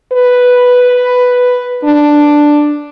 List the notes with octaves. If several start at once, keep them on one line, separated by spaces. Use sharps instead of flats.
B4
D4